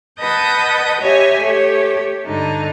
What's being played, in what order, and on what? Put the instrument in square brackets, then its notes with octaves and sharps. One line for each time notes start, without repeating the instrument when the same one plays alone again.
[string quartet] B4 D#5 F#5 A5 D#6 G6
G4 C#5 D#5 E5 G#5
A3 G4 C#5
G2 D3 D#4